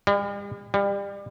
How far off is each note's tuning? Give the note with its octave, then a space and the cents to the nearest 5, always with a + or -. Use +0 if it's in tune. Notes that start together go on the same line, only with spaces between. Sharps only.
G3 +45
G3 +30